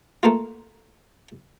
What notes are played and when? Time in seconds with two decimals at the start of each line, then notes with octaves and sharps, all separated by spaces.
0.23 A3 A#3 F4